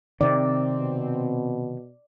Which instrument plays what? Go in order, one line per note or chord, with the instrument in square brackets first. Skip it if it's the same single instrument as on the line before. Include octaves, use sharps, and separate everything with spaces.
[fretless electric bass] C3 D#3 [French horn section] C4 [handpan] D5
[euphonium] B2